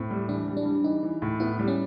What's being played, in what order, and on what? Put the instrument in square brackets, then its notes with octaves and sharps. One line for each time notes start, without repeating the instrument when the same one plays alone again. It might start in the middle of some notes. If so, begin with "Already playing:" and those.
Already playing: [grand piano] A2 [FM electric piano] C4
[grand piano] G3
[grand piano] E3 [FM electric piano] D4
[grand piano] G3
[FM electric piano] D4
[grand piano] G3
[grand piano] E3 [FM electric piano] D#4
[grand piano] E3
A2
[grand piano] B3 [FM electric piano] E4
[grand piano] G3
[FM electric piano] C#4